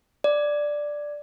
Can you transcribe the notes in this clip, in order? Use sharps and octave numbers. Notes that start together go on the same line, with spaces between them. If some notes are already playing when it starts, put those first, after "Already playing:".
D5